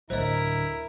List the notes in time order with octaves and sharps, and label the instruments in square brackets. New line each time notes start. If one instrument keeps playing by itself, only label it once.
[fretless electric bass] D2 A2 F#3 [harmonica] E4 [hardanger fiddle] A#4 [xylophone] C5 D#5